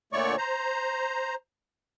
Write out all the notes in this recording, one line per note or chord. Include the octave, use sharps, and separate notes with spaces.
A#2 D3 A3 C#5 D5 C#6
C5 A#5